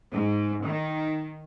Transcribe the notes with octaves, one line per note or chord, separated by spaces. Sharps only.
G#2
D#3